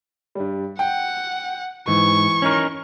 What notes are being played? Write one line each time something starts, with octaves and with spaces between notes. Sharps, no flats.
G2 G3
F#5 G5
G#2 E3 C#6
C#4 D#4 A#4